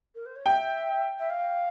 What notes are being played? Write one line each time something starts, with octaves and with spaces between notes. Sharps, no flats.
A#4
C5
C#5
E5 G5
E5
F5